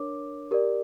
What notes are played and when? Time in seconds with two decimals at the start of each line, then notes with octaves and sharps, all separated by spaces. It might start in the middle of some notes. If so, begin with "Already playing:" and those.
Already playing: D4 A#4 C#5 D6
0.51 G4 A#4 D5